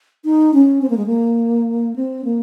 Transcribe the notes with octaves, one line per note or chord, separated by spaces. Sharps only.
D#4
C#4
C4
A#3
G#3
A#3
C4
A#3